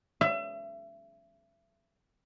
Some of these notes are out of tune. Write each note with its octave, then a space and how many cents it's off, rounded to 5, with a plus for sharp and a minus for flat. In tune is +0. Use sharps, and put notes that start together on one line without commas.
E5 +35